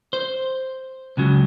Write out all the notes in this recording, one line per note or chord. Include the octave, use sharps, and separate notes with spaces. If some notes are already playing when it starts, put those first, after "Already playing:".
C5
C#2 C#3 F#3